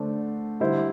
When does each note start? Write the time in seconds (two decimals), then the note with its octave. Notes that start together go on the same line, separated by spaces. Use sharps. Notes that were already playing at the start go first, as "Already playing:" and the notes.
Already playing: D3 A3 D4 C5
0.60 D3 G3 E4 C5